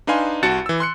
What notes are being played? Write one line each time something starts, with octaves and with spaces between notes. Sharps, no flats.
D4 D#4 B4 F5 G#5 C6
C2 F#4 F#5 A5 A6 C#7
E3 E6
C6 F#6 C#7